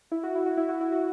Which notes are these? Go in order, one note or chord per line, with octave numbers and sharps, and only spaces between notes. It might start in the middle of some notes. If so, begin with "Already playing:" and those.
E4
F#4
E4
F#4
E4
F#4
E4
F#4